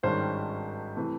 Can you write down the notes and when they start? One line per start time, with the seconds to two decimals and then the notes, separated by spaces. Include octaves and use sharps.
0.03 G#1 G2 D#3 G#3 C#4 C5
0.97 C3 E3 A3